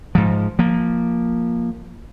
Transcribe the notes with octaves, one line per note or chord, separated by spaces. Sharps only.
G#2 F3
F3 A#3